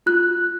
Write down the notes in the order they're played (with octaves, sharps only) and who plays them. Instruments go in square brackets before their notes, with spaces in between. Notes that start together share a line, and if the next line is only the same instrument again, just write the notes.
[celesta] F4 F#6